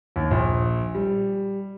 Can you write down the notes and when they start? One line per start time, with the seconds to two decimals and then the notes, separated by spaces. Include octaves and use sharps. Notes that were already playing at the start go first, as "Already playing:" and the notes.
0.16 D#2
0.31 A#1
0.95 G3